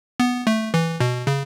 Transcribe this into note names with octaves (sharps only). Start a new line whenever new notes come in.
B3
A3
E3
B2
C#3